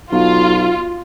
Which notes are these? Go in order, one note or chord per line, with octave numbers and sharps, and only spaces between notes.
B1 F4